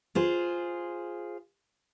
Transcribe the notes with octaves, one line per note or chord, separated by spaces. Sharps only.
F4 G#4 C5